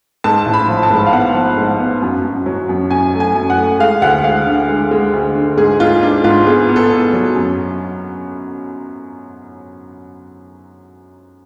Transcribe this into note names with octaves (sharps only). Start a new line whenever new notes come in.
G#2 A5
A1
B5
F3
A5
G#2
F5
B3 F#5
F3
G#2
B3
F#2
F#2
F#3
F#2
F#2 G#5
A3
G#5
F#2
F#5
A3
G#3 F5
D2 F#5
G#3 F5
D3
G#3
G#3
D2
D3
G#2 G#4
G#2 F4
G#2 D4
G#2 F4
B3 G#4
B3
A4
B3
F#3
F#2